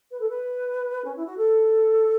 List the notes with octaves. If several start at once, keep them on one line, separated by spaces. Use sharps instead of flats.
B4
A4
B4
C#4
E4
F#4
A4